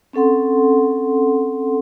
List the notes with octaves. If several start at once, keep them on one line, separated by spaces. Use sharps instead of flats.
C4 C#4 A4 F#5 C6